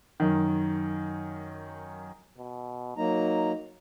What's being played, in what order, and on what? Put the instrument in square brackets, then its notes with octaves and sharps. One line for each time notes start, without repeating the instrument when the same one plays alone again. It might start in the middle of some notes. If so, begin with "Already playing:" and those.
[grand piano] F#2 D#3
[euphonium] B2
[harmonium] F#3 A#3 A#5 [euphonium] D#4